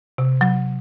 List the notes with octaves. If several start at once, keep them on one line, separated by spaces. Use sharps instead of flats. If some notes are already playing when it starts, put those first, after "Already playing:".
C3
F#3